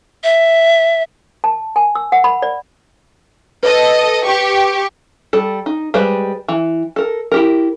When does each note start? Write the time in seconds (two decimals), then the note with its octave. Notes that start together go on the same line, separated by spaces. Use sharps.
0.24 E5
1.44 A5
1.76 G#5
1.95 E6
2.12 F#5
2.24 B5
2.42 D5
3.63 A4 B4 D#5
4.25 G4 C#6
5.33 G3 A4
5.66 D#4
5.94 G3 G#3 B4 C5
6.48 E3
6.96 A4 A#4
7.32 E4 G4 A#4